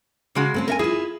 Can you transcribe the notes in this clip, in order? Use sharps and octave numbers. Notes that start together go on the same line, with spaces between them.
C#3 G#3 F#4
A3 C4 C#4
A#4 E5 G#5
E4 F4 G#4